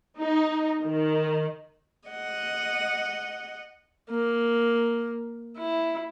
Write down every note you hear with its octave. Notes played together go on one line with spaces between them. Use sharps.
D#4
D#3
D#5 F#5
A#3
E4